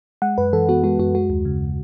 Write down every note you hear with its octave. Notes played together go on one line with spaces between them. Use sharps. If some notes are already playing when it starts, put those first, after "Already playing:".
G#3 F#5
F#2 B4
E3 A4
B3 F#4
G#3 F#4
F#2 F#4
G#3 F#4
D#2
C#3